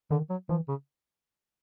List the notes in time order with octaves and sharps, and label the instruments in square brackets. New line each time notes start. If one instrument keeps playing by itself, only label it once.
[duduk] D3 [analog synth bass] D#3
[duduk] F#3
[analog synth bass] E3 [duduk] F3
[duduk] C#3